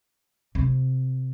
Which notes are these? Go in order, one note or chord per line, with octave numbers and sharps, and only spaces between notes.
C3